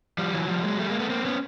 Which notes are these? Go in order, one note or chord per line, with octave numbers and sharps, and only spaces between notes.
F3 G3
E3 F#3
F3 G3
F#3 G#3
G3 A3
G#3 A#3
A3 B3
A#3 C4
B3 C#4